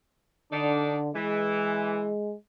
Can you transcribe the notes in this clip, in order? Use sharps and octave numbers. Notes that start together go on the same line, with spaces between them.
D3 D4 D#4 D5
E3 G#3